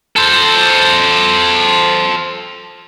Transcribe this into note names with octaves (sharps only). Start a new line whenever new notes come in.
A4 C5